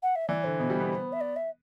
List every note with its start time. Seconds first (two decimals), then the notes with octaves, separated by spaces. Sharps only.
0.03 F#5
0.16 E5
0.29 E3 D5
0.44 D3 C5
0.59 B2
0.70 G3
0.80 B3
1.13 E5
1.21 D5
1.36 E5